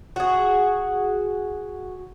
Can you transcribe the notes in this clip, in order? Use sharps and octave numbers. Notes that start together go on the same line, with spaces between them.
F#4 G#4